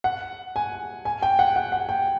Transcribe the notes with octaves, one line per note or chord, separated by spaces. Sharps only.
F#5
G#5
G#5
G5
F#5
F#5
F#5
G5